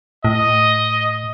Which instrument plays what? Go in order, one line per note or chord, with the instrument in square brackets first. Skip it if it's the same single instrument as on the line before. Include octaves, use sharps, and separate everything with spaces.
[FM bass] A2 [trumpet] D#5